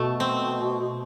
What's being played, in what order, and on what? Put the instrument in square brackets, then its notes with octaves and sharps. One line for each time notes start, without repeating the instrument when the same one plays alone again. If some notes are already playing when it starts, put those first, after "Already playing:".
Already playing: [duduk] B2 [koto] A3
[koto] C4